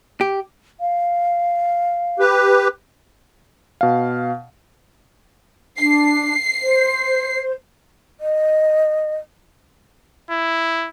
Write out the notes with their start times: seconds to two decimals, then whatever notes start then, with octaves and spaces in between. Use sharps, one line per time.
0.21 G4
0.80 F5
2.19 G4 B4
3.81 B2 F5
5.78 D4 C7
6.62 C5
8.20 D#5
10.31 E4